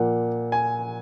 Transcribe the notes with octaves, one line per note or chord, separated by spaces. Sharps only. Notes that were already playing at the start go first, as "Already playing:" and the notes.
Already playing: A#2 F3 A#3 F#5
G#5